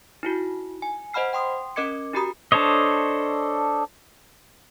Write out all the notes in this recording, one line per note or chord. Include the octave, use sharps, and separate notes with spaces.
D#4 E4 F#4
G#5
C5 D#5 F#5 B5 F6 C7
G5 C6 D#6
C#4 A#4 D#5 D6 G#6 C#7
D#4 F#4 G4 A#5 B5 D#6
D4 A4 C5 C#5 D#5